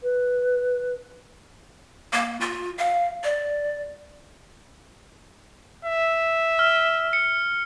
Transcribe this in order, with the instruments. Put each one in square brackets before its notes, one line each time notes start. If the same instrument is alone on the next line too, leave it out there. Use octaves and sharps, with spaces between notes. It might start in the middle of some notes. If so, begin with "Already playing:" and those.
[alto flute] B4
[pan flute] A#3
F4
F5
D5
[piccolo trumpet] E5
[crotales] F6
C#7